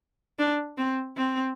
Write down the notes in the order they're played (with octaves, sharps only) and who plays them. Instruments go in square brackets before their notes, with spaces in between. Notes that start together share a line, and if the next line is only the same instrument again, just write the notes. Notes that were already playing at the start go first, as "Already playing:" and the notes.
[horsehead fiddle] D4
C4
C4